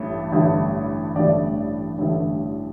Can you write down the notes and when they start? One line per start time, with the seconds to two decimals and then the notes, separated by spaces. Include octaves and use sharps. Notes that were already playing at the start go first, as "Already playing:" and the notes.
Already playing: A1 G2 A3
0.32 A1 G2 D3 A3
1.16 A1 G2 D3 A3 D5
1.98 A1 G2 D3 A3